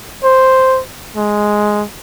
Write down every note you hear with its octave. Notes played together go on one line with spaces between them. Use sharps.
C5
G#3